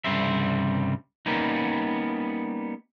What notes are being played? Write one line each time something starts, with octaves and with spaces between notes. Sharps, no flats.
C2 G2 C#3 G3 C5 E5
G3 A#3 B3 C#4 D#4